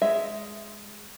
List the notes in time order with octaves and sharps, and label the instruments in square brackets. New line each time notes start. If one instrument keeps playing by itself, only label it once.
[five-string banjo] G#3 E5